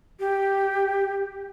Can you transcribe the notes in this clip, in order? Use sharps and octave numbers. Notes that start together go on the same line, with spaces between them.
G4